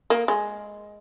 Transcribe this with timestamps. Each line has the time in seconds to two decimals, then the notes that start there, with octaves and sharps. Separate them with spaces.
0.10 A#3
0.28 G#3